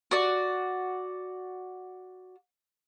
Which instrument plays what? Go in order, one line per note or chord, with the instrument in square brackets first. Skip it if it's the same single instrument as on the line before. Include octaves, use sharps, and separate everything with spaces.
[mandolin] F#4 D5